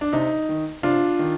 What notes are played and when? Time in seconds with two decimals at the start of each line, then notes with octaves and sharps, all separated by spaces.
0.01 D4
0.13 C3 D#4
0.49 D#3
0.83 C3 D4 F4
1.19 D#3